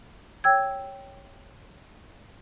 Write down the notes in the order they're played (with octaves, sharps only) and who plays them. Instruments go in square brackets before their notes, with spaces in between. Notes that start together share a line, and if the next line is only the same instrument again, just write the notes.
[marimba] C#5 G5 E6 G#6